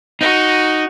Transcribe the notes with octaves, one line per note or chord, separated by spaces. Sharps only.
D#4 F#4